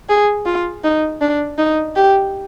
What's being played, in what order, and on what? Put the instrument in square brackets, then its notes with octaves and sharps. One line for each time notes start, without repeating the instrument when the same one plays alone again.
[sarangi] G#4
F4
D#4
D4
D#4
G4